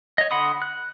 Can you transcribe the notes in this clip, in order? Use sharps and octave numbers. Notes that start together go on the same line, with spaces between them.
C#5 D#5
D3 F#5 B5 C6 D#6
F#6